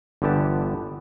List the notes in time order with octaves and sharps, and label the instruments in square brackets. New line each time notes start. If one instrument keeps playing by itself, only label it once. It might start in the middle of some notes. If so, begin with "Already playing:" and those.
[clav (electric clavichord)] G1 D3 E3 B3 G4 A5